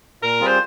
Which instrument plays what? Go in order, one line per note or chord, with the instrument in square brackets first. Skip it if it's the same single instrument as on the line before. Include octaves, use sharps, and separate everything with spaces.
[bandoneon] A#2 [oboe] A#4
[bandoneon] G3 C4 F4 G#4
[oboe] C5